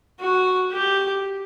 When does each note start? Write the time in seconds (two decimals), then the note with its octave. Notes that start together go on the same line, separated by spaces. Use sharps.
0.20 F#4
0.72 G4